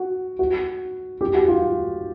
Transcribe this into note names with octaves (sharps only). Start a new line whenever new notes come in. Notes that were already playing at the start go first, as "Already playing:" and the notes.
Already playing: F#4
F#4
G4
F#4
F4